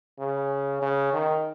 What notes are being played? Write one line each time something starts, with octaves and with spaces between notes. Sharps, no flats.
C#3
C#3
D#3